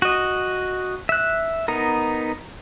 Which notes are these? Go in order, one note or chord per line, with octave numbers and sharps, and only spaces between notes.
F#4 D#5
E5 F#6
B3 D#4 A#4